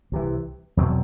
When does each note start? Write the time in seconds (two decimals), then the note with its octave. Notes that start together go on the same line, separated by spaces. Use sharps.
0.12 C2 C3 E3
0.77 E2 B2 F#3 C4